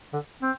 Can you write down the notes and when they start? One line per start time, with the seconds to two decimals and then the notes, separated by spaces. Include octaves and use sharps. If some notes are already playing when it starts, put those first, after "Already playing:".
0.13 D3
0.42 C4